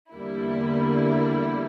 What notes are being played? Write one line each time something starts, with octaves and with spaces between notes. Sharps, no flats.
E2 D3 G3 A#3 E4